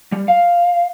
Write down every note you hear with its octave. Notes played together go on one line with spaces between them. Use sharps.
G3
F5